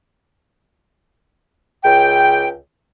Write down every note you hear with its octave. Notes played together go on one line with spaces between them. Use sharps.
C#2 G5